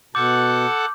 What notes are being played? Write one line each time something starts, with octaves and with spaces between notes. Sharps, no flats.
B2 A4 F#5 D6 G6